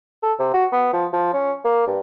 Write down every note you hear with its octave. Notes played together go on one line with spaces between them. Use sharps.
A4
C3
F#4
B3
F3
F3
C#4
A#3
G2